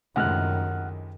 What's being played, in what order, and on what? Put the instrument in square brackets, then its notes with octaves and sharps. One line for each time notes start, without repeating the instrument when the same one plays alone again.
[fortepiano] C#2 A2 C3 [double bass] F#2 D#3 [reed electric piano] F#5 F6 F#6